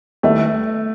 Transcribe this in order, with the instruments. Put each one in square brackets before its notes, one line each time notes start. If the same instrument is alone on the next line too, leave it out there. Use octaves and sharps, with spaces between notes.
[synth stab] D#2 D#3 G3 B3 E4 [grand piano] A3